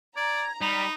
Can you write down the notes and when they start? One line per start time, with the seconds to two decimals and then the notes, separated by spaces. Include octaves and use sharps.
0.17 D5 A#5 G#6
0.61 G3 D#4 B5